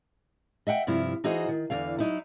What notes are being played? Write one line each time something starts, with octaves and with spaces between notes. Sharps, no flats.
D#5 E5 F#5 G5
G2 C3 F3 E4
E3 D#4 F#4 G#4 C5 D#5
D#3
E2 D3 E3 F5
F#3 D#4 E4